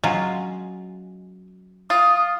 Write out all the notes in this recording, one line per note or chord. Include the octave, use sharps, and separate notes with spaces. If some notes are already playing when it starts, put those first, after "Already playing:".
F#3 G#3 C#4 F4
F4 D#6